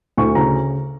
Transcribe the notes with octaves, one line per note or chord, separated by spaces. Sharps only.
D2 C#6
C#3 A#5